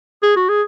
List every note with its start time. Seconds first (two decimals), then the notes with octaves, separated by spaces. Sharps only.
0.23 G#4
0.36 F#4
0.49 G#4